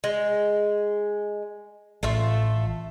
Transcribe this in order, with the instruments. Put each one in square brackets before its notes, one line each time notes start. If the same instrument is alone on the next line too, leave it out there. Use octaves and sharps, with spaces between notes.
[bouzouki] G#3
[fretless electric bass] A1 [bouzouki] A3 F4 E5